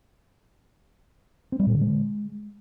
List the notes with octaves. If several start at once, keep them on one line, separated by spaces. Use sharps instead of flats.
C4
G3
A#2
D3
G#3